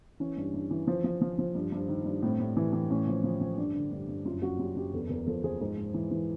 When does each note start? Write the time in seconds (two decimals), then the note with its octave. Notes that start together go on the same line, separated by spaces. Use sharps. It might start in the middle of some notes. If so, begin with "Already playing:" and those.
0.20 E3 C#4
0.37 G2
0.54 G2
0.71 E3
0.87 F3
1.04 F3
1.21 F3
1.39 F3
1.55 G2
1.72 G2
1.88 D#3
2.05 G2
2.23 A2 C4
2.40 A2
2.57 E3
2.73 E3
2.90 A2 C#4
3.07 F3
3.24 F3
3.41 F3
3.58 G2 D4
3.74 D3
3.92 G2
4.08 G2
4.25 F#2 F4
4.42 F#2 F#4
4.59 F#2 G4
4.76 F#2 G4
4.93 E2 A4
5.09 E2 A#4
5.26 F3 A4
5.44 F3 G#4
5.61 G#2 G#4
5.77 G#2
5.94 E3
6.11 E3